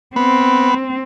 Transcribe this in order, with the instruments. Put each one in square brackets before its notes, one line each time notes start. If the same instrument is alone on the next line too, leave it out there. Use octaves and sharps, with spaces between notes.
[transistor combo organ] B3 [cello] C4